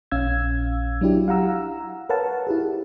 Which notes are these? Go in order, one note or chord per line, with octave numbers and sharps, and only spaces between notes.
A#1 C#4 F5 E6 G#6
F#3 D4 E4 G4
F5 F#5 A#5 E6
A#4 B4 C#5 F5 F#5 A5
E4 G4 G#4